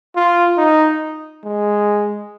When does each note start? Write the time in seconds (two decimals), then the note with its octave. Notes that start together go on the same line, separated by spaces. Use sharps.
0.16 F4
0.58 D#4
1.45 G#3